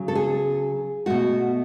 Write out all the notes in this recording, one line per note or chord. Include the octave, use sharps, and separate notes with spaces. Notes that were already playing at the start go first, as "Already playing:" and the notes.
Already playing: C#3 F#3
A4
G#4
B2 A3 F#4